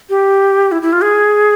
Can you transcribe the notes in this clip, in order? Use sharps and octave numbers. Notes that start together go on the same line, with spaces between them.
G4
E4
E4
F4
G#4